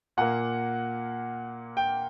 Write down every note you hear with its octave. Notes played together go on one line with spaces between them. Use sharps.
A#2 A#3 F#5
G5